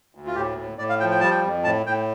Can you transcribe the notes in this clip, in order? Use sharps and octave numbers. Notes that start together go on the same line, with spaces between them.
D2
F4
A2 G4
A2
A2 D5
F5
F3 G5
G5
G3 A5
G5
F2
A2 A5
A2 G5